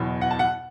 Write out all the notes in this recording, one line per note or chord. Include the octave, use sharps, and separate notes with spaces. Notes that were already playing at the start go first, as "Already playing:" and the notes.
Already playing: F#1 E2 B2
F#5
A5
F#5